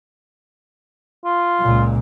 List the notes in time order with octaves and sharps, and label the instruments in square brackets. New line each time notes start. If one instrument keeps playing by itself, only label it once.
[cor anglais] F4
[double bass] C#2 A#2